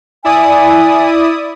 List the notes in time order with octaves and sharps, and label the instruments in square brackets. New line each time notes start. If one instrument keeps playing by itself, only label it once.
[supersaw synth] E4 D5 D#6 [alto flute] G#5